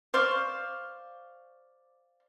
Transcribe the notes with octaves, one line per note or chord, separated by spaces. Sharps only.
C5 D5 F5 C#6